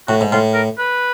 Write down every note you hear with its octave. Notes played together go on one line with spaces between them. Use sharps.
A2 F#4
G#2
A2 F4
A#4
B4